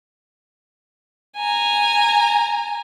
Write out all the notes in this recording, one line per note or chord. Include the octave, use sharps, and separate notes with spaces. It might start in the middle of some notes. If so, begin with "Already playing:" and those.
G#5 A#5